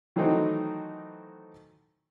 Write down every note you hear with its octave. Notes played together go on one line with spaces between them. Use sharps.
D#3 E3 F#3 A3 C4 D#4